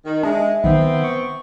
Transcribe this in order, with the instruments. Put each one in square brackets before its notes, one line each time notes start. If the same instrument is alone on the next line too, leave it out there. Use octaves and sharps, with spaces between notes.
[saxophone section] D#3
[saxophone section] G#3 [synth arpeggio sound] D4 [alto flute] E5
[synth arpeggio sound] B1 [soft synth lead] D#3 [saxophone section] B3 C4
[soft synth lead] C#6